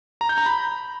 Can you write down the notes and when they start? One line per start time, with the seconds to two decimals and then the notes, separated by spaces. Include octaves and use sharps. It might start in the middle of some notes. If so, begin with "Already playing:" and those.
0.21 A#5
0.29 G6
0.38 A#5
0.46 B5